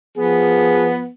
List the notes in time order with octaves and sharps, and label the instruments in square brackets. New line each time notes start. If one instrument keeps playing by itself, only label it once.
[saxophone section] F3 B3 [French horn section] G#4